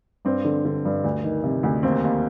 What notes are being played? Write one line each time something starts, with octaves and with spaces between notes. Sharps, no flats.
G2 C4
D3
D3
G2
D2
D#3
C3
D2
D#2 C4
D#2